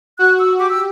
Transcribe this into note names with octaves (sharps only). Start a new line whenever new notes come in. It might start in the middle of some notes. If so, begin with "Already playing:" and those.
F#4 F#6
E6
G4 D6
E6